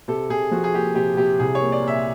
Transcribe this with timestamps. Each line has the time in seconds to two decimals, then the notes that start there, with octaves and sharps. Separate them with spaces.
0.08 C3 A4
0.30 C3 G#4
0.51 F3 F#4
0.64 G#4
0.73 A#3 G4
0.95 C3 G4
1.17 C3 G4
1.39 C2 G#4
1.55 C#5
1.61 A#3
1.72 D5
1.82 A#2
1.88 E5